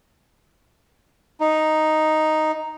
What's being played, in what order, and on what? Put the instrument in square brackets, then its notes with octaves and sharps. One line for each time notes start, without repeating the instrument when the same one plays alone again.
[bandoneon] D#4